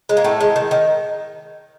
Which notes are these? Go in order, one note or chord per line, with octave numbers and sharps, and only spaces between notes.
G#3
A#3
A2 A3
G#3
D#3
D#3